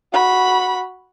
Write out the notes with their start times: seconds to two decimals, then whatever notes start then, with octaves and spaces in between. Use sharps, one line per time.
0.13 F#4 B5